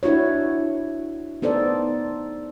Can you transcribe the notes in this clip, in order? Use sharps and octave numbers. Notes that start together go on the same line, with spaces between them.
D4 E4 F#4 C#5
B3 D#4 A4 C5 D5